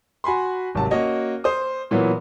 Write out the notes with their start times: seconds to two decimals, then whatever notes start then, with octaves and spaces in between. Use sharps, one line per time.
0.24 F#4 G#5 B5 C6
0.75 G#1 C3 F#3 A5
0.91 A#3 C#4 F#4 C#5 D#5
1.44 C5 D#6
1.91 A#2 E3 F#3 B3